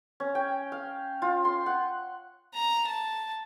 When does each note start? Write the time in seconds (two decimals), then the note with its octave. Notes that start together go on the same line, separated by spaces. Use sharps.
0.20 C#4
0.35 G5
0.72 F5
1.22 F4
1.45 C6
1.66 F#5
2.53 A#5
2.87 A5